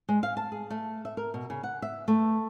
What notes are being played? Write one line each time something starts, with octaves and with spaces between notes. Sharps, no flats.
G#3
F5
A5
G#4
A3
E5
A#4
B2
C#3
F#5
E5
A3